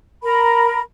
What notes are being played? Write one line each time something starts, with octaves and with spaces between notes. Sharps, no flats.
A#4 A#5 B5